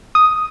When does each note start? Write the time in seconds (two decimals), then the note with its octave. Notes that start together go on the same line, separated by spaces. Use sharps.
0.15 D#6